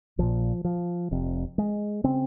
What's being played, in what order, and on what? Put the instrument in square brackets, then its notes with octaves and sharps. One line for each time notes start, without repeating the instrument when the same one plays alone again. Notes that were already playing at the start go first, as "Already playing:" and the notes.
[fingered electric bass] A#1 A#2 F3
F3
F1 F2 C3
G#3
C#3 C4